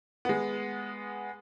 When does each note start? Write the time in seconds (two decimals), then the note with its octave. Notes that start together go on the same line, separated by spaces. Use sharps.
0.25 G#3 B3